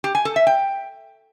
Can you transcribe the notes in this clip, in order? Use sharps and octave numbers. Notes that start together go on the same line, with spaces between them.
G4
G#5
A4
E5
G5